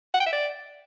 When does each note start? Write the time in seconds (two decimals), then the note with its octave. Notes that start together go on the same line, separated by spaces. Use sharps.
0.14 F#5
0.20 G5
0.26 E5
0.32 D5